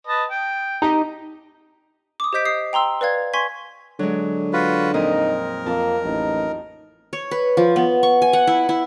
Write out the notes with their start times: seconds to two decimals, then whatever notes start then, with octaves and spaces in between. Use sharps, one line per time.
0.07 B4 D#5 A5
0.30 G5
0.82 D#4 G4 D#5 A#5
2.20 D6 D#6
2.33 G4 C5 D#5 G6 B6 D7
2.45 D#5 D#6 C7
2.73 G5 A#5 C6 E6
3.01 B4 D5 F5 G#6
3.34 G#5 C6 C#6 G#6 B6
3.99 D3 F#3 G#3
4.53 F4 F#4 B4
4.94 F2 A#2 D#4 A#4 D#5
5.66 F2 A#3 A5
6.04 A1 D#4
7.13 C#5
7.31 B4
7.57 F3
7.76 B3
8.03 C#6
8.22 G#5
8.33 F#5
8.47 E4
8.69 E4